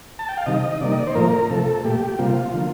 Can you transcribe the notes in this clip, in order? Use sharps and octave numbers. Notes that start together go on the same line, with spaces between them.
A5
G5
F5
C3 D#3 G3 D#5
C3 D#3 G3 A#3 D5
D#5
D5
C5
A2 F3 A#3 A#4
C3 F3 A3 A4
A#2 A3 G4
C3 G3 A#3 F4
D3 F3 A#3